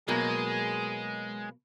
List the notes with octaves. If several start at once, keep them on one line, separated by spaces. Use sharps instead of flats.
B2 F#3 G#3 A#3 G#4